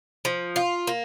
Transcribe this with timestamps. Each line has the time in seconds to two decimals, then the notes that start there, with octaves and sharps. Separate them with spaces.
0.25 F3
0.56 F4
0.87 A#3